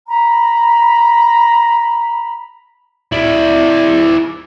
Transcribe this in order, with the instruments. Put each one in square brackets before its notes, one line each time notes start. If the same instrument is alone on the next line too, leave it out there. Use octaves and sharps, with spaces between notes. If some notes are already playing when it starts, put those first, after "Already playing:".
[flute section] A#5 B5
[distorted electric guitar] E4 D5